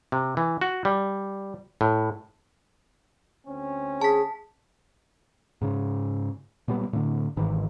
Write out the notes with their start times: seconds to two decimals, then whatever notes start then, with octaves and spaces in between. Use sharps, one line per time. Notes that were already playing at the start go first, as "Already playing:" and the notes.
0.12 C3
0.37 E3
0.61 F#4
0.85 G3
1.81 A2
3.47 D2 C4 C#4
4.01 G#4 A5 B6
5.62 G#2 C#3
6.68 A#2 F#3 G3 B3
6.93 A2 D3
7.36 G1 G#2 D#3 E3